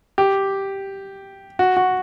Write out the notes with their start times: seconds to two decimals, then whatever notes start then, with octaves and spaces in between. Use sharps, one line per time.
0.18 G4
1.59 F#4
1.77 F#4